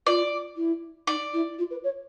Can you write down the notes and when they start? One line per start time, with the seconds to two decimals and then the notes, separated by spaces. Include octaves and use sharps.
0.07 F4 D5
0.56 E4
1.07 D#4 D5
1.33 E4
1.59 F4
1.70 B4
1.84 C#5